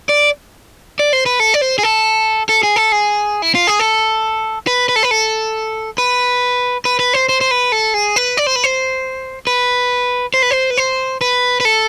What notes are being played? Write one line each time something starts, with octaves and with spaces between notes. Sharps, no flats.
D5
D5
C5
B4
A4
D5
C5
G#4
A4
A4
G#4
A4
G#4
E4
F4
G#4
A4
B4
B4
A4
B4
A4
B4
B4
B4
C5
C5
C5
B4
A4
G#4
B4
D5
C5
B4
C5
B4
C5
B4
C5
B4
C5
B4
B4
A4